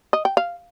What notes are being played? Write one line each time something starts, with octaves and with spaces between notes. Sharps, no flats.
D#5
G5
F5